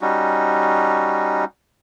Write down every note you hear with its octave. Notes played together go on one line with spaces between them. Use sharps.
G3 C#4 D#4 F#4